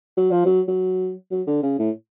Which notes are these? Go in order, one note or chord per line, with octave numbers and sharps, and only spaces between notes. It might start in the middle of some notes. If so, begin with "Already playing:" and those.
F#3
F3
F#3
F#3
F#3
D3
C#3
A2